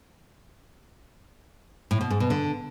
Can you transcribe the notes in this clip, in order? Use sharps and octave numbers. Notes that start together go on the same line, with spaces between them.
A2
B2
G#2
B2
D3